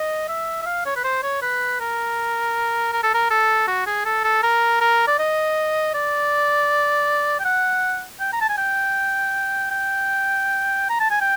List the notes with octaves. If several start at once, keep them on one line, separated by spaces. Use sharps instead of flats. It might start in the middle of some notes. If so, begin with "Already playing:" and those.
Already playing: D#5
E5
E5
F5
C#5
B4
C5
C#5
B4
A#4
A#4
A4
A#4
A4
F#4
G#4
A4
A4
A#4
A#4
D5
D#5
D5
G5
F#5
G5
A#5
A5
G#5
G5
G5
A#5
A5
G#5
G5